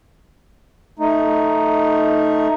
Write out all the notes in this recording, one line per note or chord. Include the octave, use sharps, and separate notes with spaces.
A3 D#4